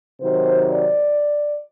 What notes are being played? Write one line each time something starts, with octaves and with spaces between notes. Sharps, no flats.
C3 D#3 F#3 C5
D5